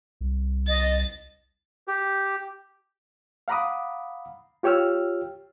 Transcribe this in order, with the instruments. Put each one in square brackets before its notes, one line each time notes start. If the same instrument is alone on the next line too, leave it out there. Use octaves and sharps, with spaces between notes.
[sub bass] C2
[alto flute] D#5 [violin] A6
[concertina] G4
[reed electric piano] F5 F#5 A#5 B5 D6 D#6
F4 G4 C#5 G5 E6 F6